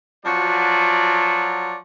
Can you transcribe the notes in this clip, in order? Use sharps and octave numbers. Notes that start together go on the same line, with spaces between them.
F3 F#3 F#4 D5